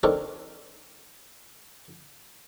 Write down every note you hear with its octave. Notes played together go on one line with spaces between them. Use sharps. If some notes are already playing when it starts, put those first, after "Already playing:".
C4 D4 D#4 A4 A#4 C#5